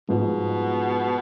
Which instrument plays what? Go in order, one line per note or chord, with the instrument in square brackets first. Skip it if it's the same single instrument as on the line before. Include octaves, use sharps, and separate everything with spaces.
[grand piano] G#2 F3 B3 [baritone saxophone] B2